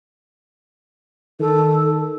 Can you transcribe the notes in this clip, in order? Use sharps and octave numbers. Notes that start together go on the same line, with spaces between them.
D#3 A4